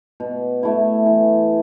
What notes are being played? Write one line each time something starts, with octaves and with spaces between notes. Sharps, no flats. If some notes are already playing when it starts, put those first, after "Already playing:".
B2
A3 E4
E3